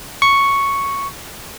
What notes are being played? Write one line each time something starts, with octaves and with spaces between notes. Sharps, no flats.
C#6